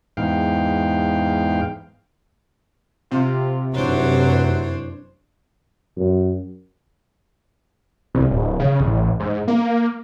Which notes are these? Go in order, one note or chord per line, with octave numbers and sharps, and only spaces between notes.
E2 G#2 F5 G5
C3 F4
F1 F#2 E3 F#3 D4 C5 C#5
F#2
C2
D1
C#3
A1
G#2
A#3